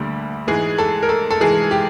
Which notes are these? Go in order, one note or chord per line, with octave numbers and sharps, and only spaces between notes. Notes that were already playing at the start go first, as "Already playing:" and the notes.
Already playing: D2 D3 G3 A#3
G#2 E3 G#3 G#4
A4
A#4
A4
A4
G#2 E3 G#3 G#4
G4